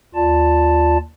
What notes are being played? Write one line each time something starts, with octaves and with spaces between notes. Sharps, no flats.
D#2 F4 D5 A5